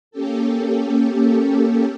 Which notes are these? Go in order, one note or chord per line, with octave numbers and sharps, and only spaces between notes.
A#3 C#4 G4 A4